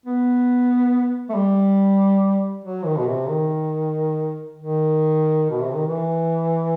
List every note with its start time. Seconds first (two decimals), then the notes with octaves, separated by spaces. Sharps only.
0.06 B3
1.30 A3
1.34 G3
2.65 F#3
2.85 D#3
2.99 B2
3.07 C3
3.29 D#3
4.58 D#3
5.51 B2
5.63 C3
5.75 D#3
5.87 E3